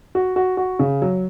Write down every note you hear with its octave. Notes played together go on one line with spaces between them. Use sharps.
F#4
F#4
F#4
C#3
F#3